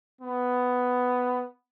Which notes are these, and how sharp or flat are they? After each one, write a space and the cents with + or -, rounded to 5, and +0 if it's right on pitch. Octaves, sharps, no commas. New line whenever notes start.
B3 +10